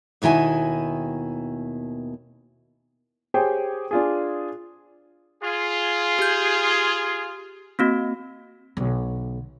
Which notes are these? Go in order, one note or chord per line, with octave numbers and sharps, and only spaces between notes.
D#2 B2 D#3 E4 G#5
G4 G#4 C5 C#5 G5
D4 F4 G#4
F4 G#4
G4 G6
A#3 C4 F#4
B1 D3